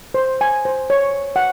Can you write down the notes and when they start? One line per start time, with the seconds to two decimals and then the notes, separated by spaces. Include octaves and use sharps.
0.14 C5
0.41 G#5
0.65 C5
0.90 C#5
1.36 F#5